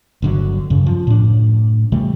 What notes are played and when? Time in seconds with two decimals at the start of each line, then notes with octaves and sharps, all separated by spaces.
0.22 G1 D3 F#3
0.70 F#2 C#3
0.86 F3
1.07 A2 D4
1.92 C3 E3 G3 A3